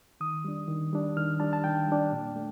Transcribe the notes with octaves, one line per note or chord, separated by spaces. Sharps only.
D#3 D#6
G3 D4
D#3
G3 D4
D#3 F6
G3 D4 A5
A5
D#3 G5
G3 D4
A#2
A3